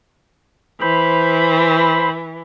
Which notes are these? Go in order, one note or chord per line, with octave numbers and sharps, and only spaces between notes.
E3 C5 B5